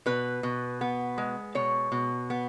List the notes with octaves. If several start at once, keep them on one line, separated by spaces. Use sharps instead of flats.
B2 B4
B2
B3
G#3
B2 C#5
B2
B3